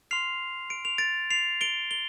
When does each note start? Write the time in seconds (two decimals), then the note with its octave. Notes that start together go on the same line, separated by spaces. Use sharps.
0.11 C6 F6 C7 F7
0.70 D7
0.85 F7
0.98 A6 D7
1.31 C7 F7
1.61 D7 G7
1.91 G7